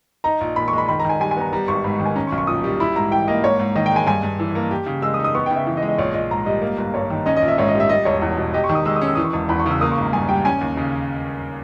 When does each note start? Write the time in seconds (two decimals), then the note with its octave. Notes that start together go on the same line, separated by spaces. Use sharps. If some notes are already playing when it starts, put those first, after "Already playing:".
0.24 D#4 A#5
0.41 A#1
0.56 A#2 B5
0.68 C#6
0.73 G#3 B5
0.89 D#3 B5
0.99 A#5
1.05 D#3 G#5
1.20 G3 G#5
1.31 G#5
1.37 B3 A#5
1.53 G3 A#5
1.68 G#1 C#6
1.84 G#2 B5
2.00 D#3
2.05 G#5
2.16 C#4 A#5
2.27 C#6
2.32 B1
2.38 C#6
2.47 A#2 D#6
2.64 G3
2.80 E4 B5
2.96 G#2 A#5
3.11 E3 G5
3.27 A#3 D#5
3.43 G#2 C#5
3.60 G#2
3.75 D#3 D#5
3.86 G5
3.91 G#3 G#5
4.07 G2 G#5
4.23 G2
4.40 E3
4.55 A#3
4.71 G4
4.86 C#3
5.02 G#3 E6
5.14 D#6
5.19 D#4
5.24 D#6
5.35 B3 C#6
5.46 G5
5.51 C#3
5.56 E5
5.67 E3
5.77 D#5
5.82 G#3
5.88 D#5
5.98 A#1 C#5
6.14 A#1 D#5
6.31 G#2 A#5
6.46 G3 D#5
6.62 A#3
6.78 G1
6.94 G2 C#5
7.10 D#3
7.26 C#4 D#5
7.36 D#5
7.42 A#1
7.48 E5
7.58 G#2 C#5
7.68 D#5
7.75 G3
7.80 E5
7.89 G3 D#5
8.05 E1 C#5
8.22 E2
8.37 B2
8.54 G4 D#5
8.64 C#6
8.69 D#3
8.75 D#6
8.85 G#3 E6
8.96 D#6
9.02 C#4
9.07 E6
9.15 E3 D#6
9.25 C#6
9.33 E1 D#6
9.49 E2 B5
9.60 C#6
9.66 C#3 E6
9.81 A#3 D#6
9.91 C#6
9.98 G#1 A#5
10.13 G2 G#5
10.29 G3 G5
10.45 C#4 G#5
10.61 D#2
10.77 C#3